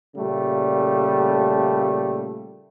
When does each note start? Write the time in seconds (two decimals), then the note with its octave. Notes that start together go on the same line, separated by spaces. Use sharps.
0.15 A#2 C#3 G3 A3